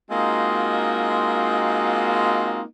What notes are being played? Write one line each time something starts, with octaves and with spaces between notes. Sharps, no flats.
G#3 A#3 C4 D#4 F4 F#4